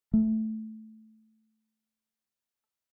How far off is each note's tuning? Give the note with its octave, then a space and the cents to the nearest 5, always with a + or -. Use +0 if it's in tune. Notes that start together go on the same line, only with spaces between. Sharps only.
A3 -5